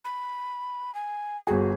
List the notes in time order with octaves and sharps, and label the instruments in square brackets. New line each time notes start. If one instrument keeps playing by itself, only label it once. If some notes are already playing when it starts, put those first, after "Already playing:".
[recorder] B5
G#5
[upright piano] G1 G#4 [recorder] F#4